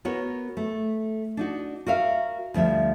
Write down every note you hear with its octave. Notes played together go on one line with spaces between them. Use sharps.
B3 F#4 A#4 C#5
A3
D4 D#4 F#4
F#4 A#4 E5 F5
D2 F3 G3 E5